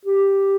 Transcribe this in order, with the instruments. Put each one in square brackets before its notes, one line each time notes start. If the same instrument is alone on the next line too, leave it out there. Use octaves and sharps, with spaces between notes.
[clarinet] G4